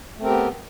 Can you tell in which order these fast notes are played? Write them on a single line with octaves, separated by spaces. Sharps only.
A3 C4 A#4 G4 B3